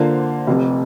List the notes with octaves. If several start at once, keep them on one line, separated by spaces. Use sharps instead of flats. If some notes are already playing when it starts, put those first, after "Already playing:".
Already playing: D3 A#3 F4 C5
F1 F2 C3